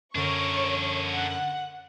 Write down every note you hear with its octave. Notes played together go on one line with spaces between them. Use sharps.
F#2 D3 D4 A#4 C#5 C#6
F#5